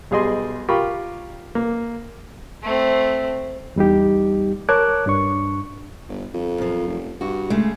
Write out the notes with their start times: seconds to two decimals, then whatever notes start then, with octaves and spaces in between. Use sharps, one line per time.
0.11 B1 G3 G#4 D5 D#5 C6
0.69 F4 G4 A#4 B5 C#6
1.55 A#3
2.63 A3 C4
3.76 E2 G3 D#4 G4
4.69 A#4 C#5 A5 D6 F#6 G#6
5.06 G2 D4 C#6
6.09 G1
6.34 F2
6.58 F#2 F3
6.87 F1
7.21 G2 F#4
7.50 C#3 G#3 A3